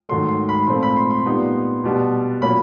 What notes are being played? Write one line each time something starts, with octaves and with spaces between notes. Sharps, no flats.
G#2 D#3 F#3 A3 C6
C6
B5
A#2 F3 A3 C4 C6
B5
C6
C6
A#2 G3 B3 D#4
B2 G3 B3 D4
A#2 F#3 A#3 C#4 B5